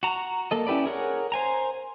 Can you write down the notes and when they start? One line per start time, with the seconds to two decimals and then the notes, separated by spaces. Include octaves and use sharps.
0.03 F#4 A#5
0.51 A#3 A4 D#5
0.67 C#4 E4 G4 B4 D5
0.86 G#4 A#4 C#5 F#5
1.32 C5 G#5 A#5